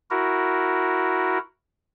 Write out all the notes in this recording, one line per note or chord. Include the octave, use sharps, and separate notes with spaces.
E4 F#4 A#4